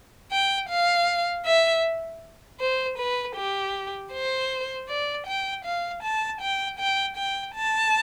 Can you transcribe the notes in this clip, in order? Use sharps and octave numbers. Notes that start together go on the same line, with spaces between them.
G5
F5
E5
C5
B4
G4
C5
D5
G5
F5
A5
G5
G5
G5
A5